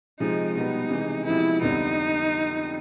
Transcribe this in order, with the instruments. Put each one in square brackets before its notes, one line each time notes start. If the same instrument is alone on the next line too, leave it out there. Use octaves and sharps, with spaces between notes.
[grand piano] C3 F3 G#3 [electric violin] D#4
[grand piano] B2 G3 B3 [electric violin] D#4
[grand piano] C3 E3 G#3
[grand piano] C3 F3 G#3 B3 [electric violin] E4
[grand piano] F2 D3 G3 B3 [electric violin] D#4